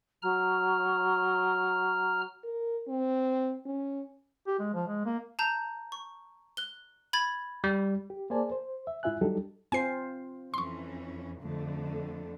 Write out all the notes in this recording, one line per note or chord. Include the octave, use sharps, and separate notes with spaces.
F#3 A#5 F6
A#4
C4
C#4
G4
G#3
F3
G#3
A#3
A5 A#5 G6
C#6
F#6 G7
B5 G#6 A6
G3
G4
A#3 G#4 C5 D5 G#5 A5
C5
E5
G#2 E4 F4 E5 G#5 F#6
F#3 G3 D4 D#4 G4 A4
C4 F4 C5 G#5 C7
F2 E3 C#4 C6 C#6
F2 D3 A3